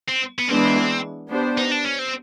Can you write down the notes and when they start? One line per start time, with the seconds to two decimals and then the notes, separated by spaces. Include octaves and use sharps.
0.08 C4
0.38 B3
0.49 E3 G#3 B3 C4 D4
1.31 B3 D4 G4 C5
1.57 D#4
1.71 D4
1.84 C#4
1.99 C4